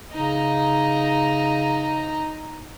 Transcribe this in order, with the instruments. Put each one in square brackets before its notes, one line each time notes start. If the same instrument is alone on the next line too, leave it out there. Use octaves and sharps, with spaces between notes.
[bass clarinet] C#3 [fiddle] D#4 A#5